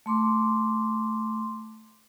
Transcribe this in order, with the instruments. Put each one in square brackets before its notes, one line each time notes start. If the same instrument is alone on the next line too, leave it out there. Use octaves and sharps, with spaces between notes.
[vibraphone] A3 C6 D6